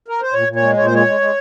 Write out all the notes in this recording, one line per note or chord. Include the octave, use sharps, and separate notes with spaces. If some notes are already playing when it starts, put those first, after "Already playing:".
A#4
C5
A#2 C#5
A#2
C#5
G#3
A#2 C#5
C5
G#3 C#5
G#3
G#3